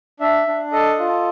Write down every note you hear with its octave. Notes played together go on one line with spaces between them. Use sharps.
D4 E5
D4
A4 D#5
F4